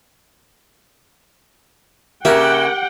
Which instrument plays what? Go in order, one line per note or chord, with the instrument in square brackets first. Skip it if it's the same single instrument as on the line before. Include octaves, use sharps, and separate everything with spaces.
[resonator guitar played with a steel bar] C#3 A#3 [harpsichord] E4 [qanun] G4 [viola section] F#5 G5